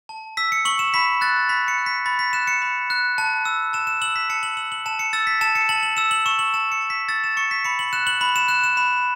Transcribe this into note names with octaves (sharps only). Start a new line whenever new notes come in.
A5
E6 B6
C#7
C#6 F#7
E7
B5 B6
F#6 A6
B5 B6
C#7
F#6
B6
B5 A6
B6
F#6 E7
C#7
B5
F#6
A5
E6
A5 E7
E7
E6 F#7
B6
A5 C#7
F#7
E6 F#7
F#7
A5 E7
C#7
E6 A6
B6
A5 E7
C#7
A5 F#7
F#7
E6 E7
F#7
C#6 E7
F#7
A5 E7
C#7
A5
B6
E6 A6
E7
C#6 C#7
B6
B5 C#7
F#7
F#6 E7
F#7
B5 F#7
E7
F#6 E7
E7
B5 E7